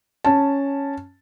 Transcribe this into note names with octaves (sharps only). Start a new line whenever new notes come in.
C#4 A5